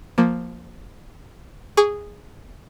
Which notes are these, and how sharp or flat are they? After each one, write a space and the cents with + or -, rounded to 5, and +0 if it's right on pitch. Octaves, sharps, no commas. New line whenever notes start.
F3 +0 A#3 +0
G#4 -10 C#6 +35